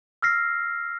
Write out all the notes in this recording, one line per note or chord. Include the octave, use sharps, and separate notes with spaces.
E6 F6 A#6 C7